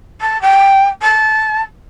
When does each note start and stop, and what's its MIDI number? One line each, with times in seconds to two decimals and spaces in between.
0.21 0.40 81
0.41 0.88 79
1.01 1.61 81